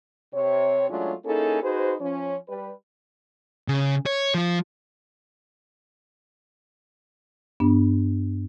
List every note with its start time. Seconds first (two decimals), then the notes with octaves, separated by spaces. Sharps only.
0.34 C3 C#5
0.89 F#3 G#3 A3 C#4 D4 F4
1.25 A#3 C#4 D#4 E4 G#4 A4
1.63 D#4 F#4 G#4 B4 C5
2.01 F3 C#4
2.48 G3 B4
3.68 C#3
4.06 C#5
4.34 F3 F4
7.60 G2 B3 D4